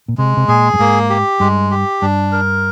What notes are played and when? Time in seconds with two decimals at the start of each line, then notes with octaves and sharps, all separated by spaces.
0.08 A#2
0.18 C3 G#3
0.37 C3
0.48 A#2 G#4
0.74 G2
0.79 G#2 A#3
1.10 G4
1.40 G2 G#3
1.71 G4
2.01 G2 D4
2.32 A#4